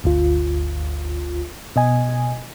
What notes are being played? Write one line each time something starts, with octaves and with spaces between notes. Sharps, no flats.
G1 D2 F4
B2 D#5 G#5